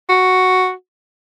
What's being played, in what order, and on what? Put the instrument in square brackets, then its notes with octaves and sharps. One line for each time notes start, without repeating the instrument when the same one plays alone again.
[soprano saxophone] F#4